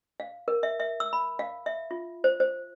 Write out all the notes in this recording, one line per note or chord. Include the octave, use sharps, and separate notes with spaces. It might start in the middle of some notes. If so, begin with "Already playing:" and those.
F5
A#4
E5
E5
E6
B5
F5
E5
F4
C5
C5